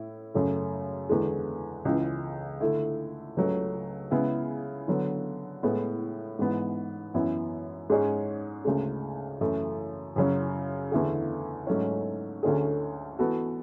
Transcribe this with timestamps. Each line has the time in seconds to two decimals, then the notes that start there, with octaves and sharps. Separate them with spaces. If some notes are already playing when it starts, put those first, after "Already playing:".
Already playing: A2 E4
0.34 F#2 C#3 F#3 A3
1.09 E2 D3 G#3
1.85 C#2 C#3 E3
2.61 D3 A3 E4
3.37 C#2 C#3 F#3 A3
4.11 C#3 G#3 B3 E4 G#4
4.88 D3 F#3 B3
5.63 A2 G#3 B3 E4
6.39 G#2 E3 B3
7.14 F#2 E3 B3 E4
7.90 G#2 G#3 C#4 G#4 C#5
8.65 D2 C#3 G#3
9.41 F#2 E3 A3 E4
10.16 F#2 C#3 F#3 C#4
10.91 E2 D3 A3 E4 G#4
11.67 G#2 F#3 A3 C#4
12.43 D2 D3 A3 C#4 G#4
13.19 E3 B3 F#4 A4